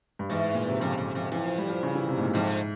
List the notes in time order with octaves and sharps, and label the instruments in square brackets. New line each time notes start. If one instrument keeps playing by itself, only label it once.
[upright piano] G2
[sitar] E2 [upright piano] G#2
[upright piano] G#2
A#2
C3
[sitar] F2 [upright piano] C#3
[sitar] F2
F2
[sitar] F2 [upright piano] E3
[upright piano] F3
G3
F3
C#3
E3
C3
G#2
A#2
[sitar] F2 [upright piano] G#2